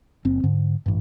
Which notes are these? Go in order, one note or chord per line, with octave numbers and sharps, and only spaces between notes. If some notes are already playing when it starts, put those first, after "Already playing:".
F#1 C4
G#2 D3
A1 G2